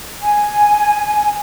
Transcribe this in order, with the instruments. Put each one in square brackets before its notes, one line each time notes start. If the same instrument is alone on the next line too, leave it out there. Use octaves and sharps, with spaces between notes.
[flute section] G#5